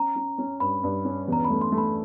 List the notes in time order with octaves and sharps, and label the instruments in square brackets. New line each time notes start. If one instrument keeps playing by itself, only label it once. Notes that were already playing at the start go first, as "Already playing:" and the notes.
Already playing: [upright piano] C#4 [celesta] A#5
[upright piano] C#4
C#4
[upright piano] G2 [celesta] B5
[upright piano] G2
C#4
[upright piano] E2 [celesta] A#5
[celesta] B5
[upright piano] A3
[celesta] C6
[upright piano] A3
[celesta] B5